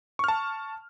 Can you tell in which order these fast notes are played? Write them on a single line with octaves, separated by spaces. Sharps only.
C#6 F6 A5